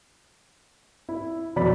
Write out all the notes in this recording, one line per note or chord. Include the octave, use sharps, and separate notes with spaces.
E4
E1 F2 F#3 B3 D5 B5